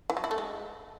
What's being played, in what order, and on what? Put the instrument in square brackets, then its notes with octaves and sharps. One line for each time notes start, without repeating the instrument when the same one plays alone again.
[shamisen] E3
F#3
E4
A3
G#3